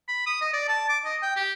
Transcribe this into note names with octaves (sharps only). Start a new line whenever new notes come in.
B5
D#6
D#5
D5
A5
D6
D#5
G5
G4